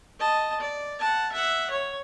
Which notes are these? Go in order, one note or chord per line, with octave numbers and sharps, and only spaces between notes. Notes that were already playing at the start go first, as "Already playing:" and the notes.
D#5 A5
D5
F#5 A5
E5 F#5
C#5